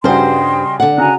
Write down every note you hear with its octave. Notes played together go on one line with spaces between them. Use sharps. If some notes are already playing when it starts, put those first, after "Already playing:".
G2 C#3 G3 F#4 C5 D#5 G5 C6
D3 F#5
C#3 F#4 G#5 A#5 F#6